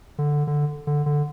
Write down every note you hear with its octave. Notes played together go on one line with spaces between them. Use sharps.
D3
D3
D3
D3